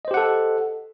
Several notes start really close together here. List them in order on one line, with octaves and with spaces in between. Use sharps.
D#5 C5 G4 F#5 A4